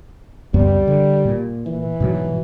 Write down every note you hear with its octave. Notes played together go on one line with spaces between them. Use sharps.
C#2 F#2 G3 B3
D3
A#2
E3
G#2 B2 F#3